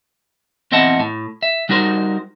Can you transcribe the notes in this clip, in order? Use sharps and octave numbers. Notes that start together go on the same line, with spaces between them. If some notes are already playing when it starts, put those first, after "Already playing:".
E2 C4 D#5 E5 F#5 A5
A2
E5
G3 D#4 F#4 A#4 C5